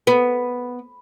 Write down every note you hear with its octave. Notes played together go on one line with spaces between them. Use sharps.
B3